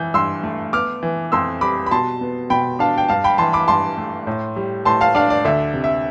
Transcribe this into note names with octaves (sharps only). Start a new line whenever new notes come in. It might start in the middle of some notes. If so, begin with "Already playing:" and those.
Already playing: E3 G6
G2 C6 E6
A3
B3 D6 F6
E3
F2 C6 E6
G3 B5 D6
B5
B2 A5 C6
B3
B2 G5 B5
D4 F5 A5
G5
G2 F5 A5
G5 B5
E3 A5 C6
B5 D6
G2 A5 C6
A3
A2
G3
A2 A5 C6
F5 A5
D4 D5 F5
D5
D2 E5
C3
E5